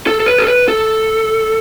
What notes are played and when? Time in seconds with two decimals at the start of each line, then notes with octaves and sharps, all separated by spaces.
0.07 A4
0.20 A4
0.26 B4
0.38 A4
0.47 B4
0.68 A4